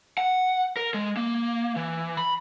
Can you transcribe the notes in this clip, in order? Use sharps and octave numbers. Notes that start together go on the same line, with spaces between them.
F#5
A#4
G#3
A#3
E3
B5